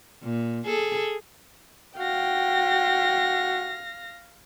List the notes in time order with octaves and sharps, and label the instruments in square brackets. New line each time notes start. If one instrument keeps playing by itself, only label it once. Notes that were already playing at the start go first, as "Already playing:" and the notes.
[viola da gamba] A#2
G#4 A4
[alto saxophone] F#4 [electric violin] F5 A#6 [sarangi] G5